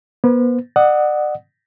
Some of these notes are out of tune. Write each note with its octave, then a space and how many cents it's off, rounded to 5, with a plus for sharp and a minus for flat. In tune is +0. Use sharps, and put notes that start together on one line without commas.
B3 -40 C5 -45
D5 +35 F#5 +0 D#6 +20